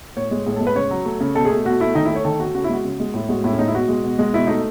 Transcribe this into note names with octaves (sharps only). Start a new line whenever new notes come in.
A2 C#5
G#3
A2 G#4
G#3 A4
B4
C#3 C#5
F#3
A3
C#3
B2 A4
G#4
A3
B2 F#4
A3 E4
D#3 D#4
E4
A3
C#5
D#3 A4
A3 F#4
C#3 F#4
E4
G#3 F#4
C#3
G#3
A2 E4
G#3 F#4
A2 E4
C#4
G#3 D#4
E4
B2 F#4
G#3
B2
G#3
B2 E4
A3 D#4